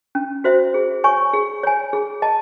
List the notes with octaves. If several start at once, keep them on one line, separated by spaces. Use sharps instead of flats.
C#4
F#4 C5 E5
G#4
C#5 G#5 C#6
G#4
C#5 G#5
G#4
D#5 A5